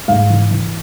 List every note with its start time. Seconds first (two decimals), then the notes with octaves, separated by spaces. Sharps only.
0.08 G#2 F5
0.30 E3
0.51 E3